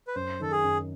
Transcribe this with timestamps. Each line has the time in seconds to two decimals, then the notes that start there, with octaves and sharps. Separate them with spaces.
0.08 B4
0.15 F#2 C5
0.40 D#3 A4
0.52 G#4
0.63 F#2